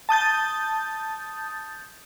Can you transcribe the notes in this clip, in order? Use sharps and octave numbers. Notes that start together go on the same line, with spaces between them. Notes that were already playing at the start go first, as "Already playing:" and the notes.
A5 D#6 G6 A6